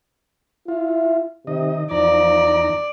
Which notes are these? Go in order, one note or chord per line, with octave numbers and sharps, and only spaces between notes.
E4 F4
C3 D#3 D#5
E2 F3 D#4 D5 A#5